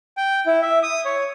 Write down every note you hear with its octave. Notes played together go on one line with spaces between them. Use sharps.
G5
E4
E5
D#6
C#5